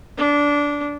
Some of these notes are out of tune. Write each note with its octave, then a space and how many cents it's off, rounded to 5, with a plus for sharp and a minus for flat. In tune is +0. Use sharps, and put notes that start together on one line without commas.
D4 -15